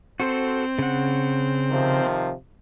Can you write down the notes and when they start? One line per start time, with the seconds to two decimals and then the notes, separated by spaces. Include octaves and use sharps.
0.20 C4 F#4 A4 C5
0.79 C#3 F#5
1.71 C3 D#3 F3